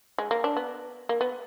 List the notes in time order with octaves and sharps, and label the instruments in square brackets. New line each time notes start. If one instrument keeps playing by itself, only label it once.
[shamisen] G#3
A#3
D4
B3
A#3
B3